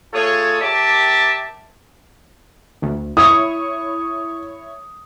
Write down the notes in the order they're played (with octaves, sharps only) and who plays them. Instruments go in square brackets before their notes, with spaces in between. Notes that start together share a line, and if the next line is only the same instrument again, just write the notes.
[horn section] A3 F4 G#4 A4 C#5
G4 A#4 D5 E5 A5
[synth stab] D2
[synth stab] E4 C#5 C#6 [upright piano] D#6